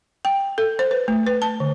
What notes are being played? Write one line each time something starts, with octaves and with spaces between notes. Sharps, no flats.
G5
A4
C5
B4
A3
B4
A5
D3